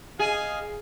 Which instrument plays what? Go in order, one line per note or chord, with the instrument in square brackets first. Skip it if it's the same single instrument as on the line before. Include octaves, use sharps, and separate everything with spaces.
[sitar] G#4 [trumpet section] D#5 F5 G#5